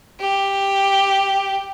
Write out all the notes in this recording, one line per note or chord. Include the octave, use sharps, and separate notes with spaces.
G4